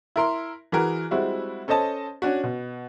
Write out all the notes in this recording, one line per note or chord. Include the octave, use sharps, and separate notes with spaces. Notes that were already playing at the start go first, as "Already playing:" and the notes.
E4 A#4 C6
E3 F#4 G#4 A#4
G3 G#3 C4 E4 F#4
C#4 A4 C5 D#5 A5
C#4 D4 F#4
B2